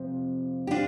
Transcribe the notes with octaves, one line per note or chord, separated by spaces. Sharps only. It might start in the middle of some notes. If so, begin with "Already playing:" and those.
Already playing: F2 C3 F3
G4
D4 F4